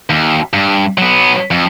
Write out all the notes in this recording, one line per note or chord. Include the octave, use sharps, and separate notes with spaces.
D#2
G2
F#3 B3
F2